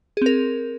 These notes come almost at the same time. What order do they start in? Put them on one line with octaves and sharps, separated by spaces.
G#4 C4 A#4